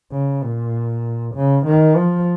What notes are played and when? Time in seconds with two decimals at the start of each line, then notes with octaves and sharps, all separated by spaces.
0.12 C#3
0.43 A#2
1.35 C#3
1.66 D#3
1.97 F3